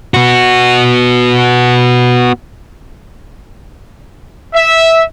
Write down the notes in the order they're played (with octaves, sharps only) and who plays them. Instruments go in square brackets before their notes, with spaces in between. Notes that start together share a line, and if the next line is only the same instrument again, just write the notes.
[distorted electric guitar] B3 F#4
[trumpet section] E5